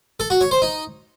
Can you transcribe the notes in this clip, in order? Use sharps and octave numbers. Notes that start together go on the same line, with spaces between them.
A4
F#4
C#5
C5
D#4